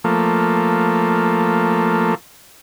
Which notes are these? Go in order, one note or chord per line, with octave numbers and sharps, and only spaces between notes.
F3 A3 A#3